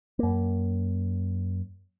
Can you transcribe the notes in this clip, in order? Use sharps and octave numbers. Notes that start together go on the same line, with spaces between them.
F#2 A#3